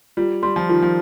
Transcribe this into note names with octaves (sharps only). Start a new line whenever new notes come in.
G3 F4
G3 C6
F3
D#3 F4
F3